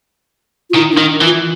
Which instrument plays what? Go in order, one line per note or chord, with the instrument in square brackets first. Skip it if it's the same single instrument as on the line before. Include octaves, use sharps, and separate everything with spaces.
[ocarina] F4
[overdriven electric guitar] D#3 [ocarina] E4
[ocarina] D4
[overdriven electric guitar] D#3
E3
[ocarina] F4